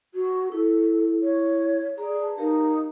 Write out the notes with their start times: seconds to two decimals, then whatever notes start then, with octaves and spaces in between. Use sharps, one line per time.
0.14 F#4
0.52 E4 A4
1.23 C#5
1.98 G#4 D5 A#5
2.19 B4 A5
2.38 D#4 G4 A#4 F5